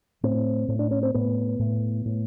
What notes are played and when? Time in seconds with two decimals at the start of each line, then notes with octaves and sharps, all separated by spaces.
0.23 A2 C4
0.68 A2
0.79 D4
0.91 C#4
1.03 C4
1.14 A2 B3
1.59 A2
2.05 A2